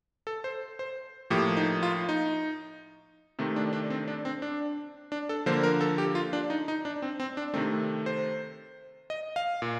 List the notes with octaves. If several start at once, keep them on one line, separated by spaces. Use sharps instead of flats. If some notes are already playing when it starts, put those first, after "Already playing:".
A4
C5
C5
A2 F3 A#3 G4
D#4
F4
D#4
C3 D#3 A3 C4
D4
D4
C4
D4
C4
D4
D4
A4
D3 F3 A#3 C5
A#4
A4
G4
F4
D4
D#4
D#4
D4
C4
C4
D4
C3 D#3 A3 C4
C5
D#5
F5
A#2